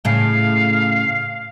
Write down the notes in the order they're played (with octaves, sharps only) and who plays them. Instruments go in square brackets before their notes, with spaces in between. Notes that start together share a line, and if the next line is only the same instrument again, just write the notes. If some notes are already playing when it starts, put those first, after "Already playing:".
[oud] A2 C#3 [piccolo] F5